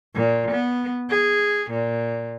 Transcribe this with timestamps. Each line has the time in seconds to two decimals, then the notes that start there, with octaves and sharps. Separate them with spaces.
0.15 A#2
0.51 B3
1.10 G#4
1.70 A#2